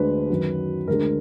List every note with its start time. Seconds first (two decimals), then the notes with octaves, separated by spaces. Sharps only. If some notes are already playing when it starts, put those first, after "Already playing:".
Already playing: D2 D3 G#3 D4 B4
0.29 F#2 D#3 F#3
0.88 D2 D3 G#3 A#4